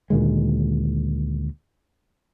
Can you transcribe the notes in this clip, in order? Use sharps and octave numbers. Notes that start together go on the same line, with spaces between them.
D2 A#2 D#3 G#3